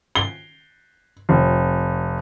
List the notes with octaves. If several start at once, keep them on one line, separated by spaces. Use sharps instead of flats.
G7
F1